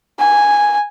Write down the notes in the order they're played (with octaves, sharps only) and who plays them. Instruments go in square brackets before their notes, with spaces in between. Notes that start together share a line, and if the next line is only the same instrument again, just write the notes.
[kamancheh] G#5